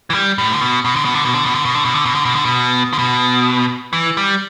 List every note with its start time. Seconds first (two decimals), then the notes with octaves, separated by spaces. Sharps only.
0.10 E3
0.14 G3
0.38 A2
0.53 D3
0.62 B2
0.85 B2
0.96 D3
1.05 B2
1.15 D3
1.25 B2
1.35 D3
1.45 B2
1.55 D3
1.65 B2
1.75 D3
1.85 B2
1.95 D3
2.05 B2
2.15 D3
2.25 B2
2.35 D3
2.45 B2
2.93 D3
2.99 B2
3.93 E3
4.17 G3